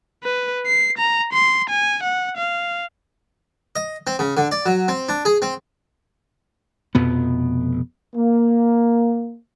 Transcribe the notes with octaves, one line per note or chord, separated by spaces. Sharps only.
B4
C7
A#5
C6
G#5
F#5
F5
D#5
C4
C#3
D3
D5
F#3
C4
D4
G#4
C4
F1 F2 B2 B3
A#3